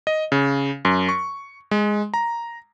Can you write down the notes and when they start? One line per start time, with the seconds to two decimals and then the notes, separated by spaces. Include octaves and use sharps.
0.07 D#5
0.32 C#3
0.85 F#2
1.09 C#6
1.71 G#3
2.14 A#5